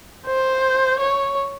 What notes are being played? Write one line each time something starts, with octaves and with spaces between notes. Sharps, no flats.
C5
C#5